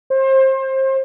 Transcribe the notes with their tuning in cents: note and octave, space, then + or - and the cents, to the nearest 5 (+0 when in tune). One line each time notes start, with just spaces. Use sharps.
C5 +30